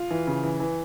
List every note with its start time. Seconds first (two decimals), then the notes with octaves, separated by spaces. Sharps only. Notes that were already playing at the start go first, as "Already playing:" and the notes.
Already playing: F4
0.11 E3
0.27 C#3
0.43 E3
0.60 E3